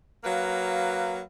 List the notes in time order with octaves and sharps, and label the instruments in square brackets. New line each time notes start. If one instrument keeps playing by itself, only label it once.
[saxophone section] F#3 A#3 B4 F5